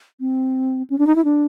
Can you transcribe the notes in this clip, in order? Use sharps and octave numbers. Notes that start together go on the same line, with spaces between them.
C4
C#4
D4
D#4
E4
D4